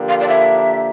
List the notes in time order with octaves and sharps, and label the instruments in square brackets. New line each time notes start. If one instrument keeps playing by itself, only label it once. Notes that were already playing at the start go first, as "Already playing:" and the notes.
Already playing: [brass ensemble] D3 F3 A#3 D4 G4
[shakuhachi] F5
D5
E5